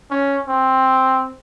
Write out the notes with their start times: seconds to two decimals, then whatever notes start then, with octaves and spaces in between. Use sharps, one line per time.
0.11 C#4
0.47 C4